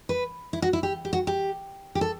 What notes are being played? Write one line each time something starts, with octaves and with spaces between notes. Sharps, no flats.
B4
E4
F#4
E4
G4
G4
F#4
G4
G4
A4